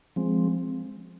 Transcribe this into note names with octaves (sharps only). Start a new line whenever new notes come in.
F3 G#3 C4